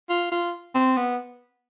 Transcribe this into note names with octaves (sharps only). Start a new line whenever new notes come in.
F4
F4
C4
B3